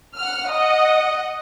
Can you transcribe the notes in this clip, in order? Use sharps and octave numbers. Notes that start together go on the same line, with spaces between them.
F#5 F6
D#5 F#5